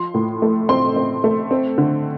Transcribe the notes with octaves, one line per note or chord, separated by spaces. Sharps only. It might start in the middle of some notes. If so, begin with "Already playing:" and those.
Already playing: F3 C6
A2
A3
C4 C6
C4
A3
C4
D3